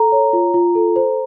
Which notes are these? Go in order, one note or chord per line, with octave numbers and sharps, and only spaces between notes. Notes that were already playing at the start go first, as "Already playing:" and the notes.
Already playing: A4 A#5
C#5
F4
F4
A4
C5